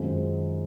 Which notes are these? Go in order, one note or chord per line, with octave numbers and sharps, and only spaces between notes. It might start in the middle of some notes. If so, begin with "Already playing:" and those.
Already playing: F#2 D#3 G#3 C4 F4